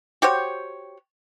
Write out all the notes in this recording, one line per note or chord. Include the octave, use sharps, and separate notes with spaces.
F#4 G4 C5 C#5